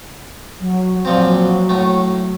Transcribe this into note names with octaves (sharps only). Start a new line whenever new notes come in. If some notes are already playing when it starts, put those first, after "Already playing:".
F#3
A#2 F3 F#3 C4
A2 A3